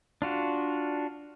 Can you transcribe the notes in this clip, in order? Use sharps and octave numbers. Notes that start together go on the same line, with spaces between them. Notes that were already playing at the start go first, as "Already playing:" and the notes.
D4 F4 F#4